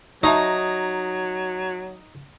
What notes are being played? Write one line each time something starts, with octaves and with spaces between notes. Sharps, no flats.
F#3 D#4 E5 A5 C#6